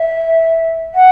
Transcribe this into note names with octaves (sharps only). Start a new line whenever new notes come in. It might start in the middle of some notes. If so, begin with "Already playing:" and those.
Already playing: E5
F#5